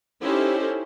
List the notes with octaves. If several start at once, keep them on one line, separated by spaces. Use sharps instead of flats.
C#4 D#4 E4 G4 A4 C5